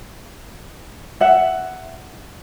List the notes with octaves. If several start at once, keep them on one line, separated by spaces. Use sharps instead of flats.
E5 F#5